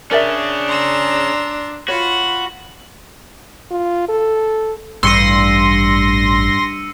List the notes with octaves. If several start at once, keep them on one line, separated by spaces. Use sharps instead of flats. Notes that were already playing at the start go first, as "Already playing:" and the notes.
C#4 D4 G#4 A#4 D5 E5
A#5 C6 E6
F4 F#4 C#5 F#5 B5
F4
A4
A1 G2 C6 E6 A#6 C#7 D#7